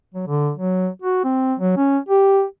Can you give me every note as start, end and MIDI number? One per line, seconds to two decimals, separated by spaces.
0.14 0.26 54
0.28 0.51 50
0.57 0.89 54
1.02 1.22 66
1.24 1.54 60
1.60 1.75 54
1.77 1.98 61
2.09 2.44 67